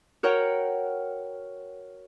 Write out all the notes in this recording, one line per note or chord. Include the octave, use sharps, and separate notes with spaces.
F#4 A#4 C#5 F#5 G5